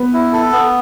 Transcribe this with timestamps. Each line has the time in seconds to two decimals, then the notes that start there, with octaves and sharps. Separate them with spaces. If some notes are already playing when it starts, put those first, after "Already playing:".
Already playing: B3
0.14 E4
0.33 A4
0.52 B3